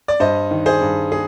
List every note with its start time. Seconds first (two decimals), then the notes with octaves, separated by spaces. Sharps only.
0.08 D5
0.20 G2 C5 D#5
0.51 D#3
0.66 G#4 C5
0.81 G2
1.12 G#4